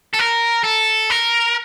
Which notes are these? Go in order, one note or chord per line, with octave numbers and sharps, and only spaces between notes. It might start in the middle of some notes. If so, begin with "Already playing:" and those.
A4
A#4
A4
A#4